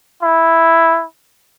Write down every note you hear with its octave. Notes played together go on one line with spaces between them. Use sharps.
E4